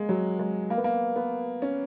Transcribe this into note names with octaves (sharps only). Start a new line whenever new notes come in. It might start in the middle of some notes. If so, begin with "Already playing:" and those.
Already playing: G#3 A#3
F#3
G#3
A#3
B3
A#3
B3
C#4